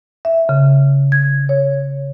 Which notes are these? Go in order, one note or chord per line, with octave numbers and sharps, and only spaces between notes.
E5
C#3
G#6
C#5